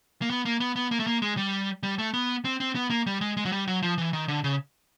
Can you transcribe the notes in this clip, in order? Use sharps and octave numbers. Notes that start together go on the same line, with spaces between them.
A#3
B3
A#3
B3
B3
A#3
A3
A#3
G#3
G3
G3
A3
B3
C4
C4
B3
A#3
G3
G#3
G#3
F#3
G3
F#3
F3
E3
D#3
D3
C#3